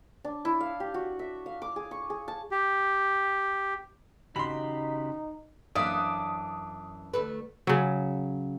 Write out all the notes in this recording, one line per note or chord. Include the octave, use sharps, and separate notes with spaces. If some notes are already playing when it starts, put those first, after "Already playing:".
D4
E4
F5
G4
F#4
E5
F5
D6
G#4
C#6
G#4
A5
G4
C#3 D#4 F#4 G4 B5 C6
F#2 E3 D4 D5 F5 D#6
D2 A3 B4
C#3 F#3